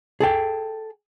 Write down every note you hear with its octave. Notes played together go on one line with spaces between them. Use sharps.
G#4 A4 G5